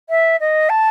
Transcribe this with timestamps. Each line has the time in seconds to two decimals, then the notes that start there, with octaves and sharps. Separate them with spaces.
0.10 E5
0.40 D#5
0.69 A5